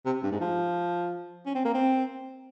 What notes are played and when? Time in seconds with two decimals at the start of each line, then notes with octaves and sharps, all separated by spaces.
0.05 C3
0.23 G2
0.31 G#2
0.41 F3
1.46 C#4
1.55 C4
1.65 A#3
1.74 C4